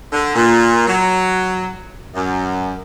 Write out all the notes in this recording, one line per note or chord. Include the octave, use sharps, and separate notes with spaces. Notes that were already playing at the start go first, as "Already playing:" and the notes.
D3
A#2
F#3
F#2